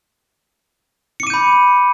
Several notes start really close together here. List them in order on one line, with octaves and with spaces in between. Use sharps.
C#7 D6 D#7 G6 B5